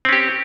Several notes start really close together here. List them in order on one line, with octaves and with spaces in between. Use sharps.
C4 C#4 G4